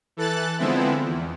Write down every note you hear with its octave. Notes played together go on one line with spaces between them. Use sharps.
E3 A4 F#6 A6
D3 F3 G#3 B3 C4 E4
E2